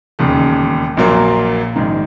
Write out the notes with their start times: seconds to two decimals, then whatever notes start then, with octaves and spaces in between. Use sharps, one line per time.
0.19 E1 D#2 C#3
0.97 A#1 A#2 F#3 A#3
1.76 A#1 G#2 D#3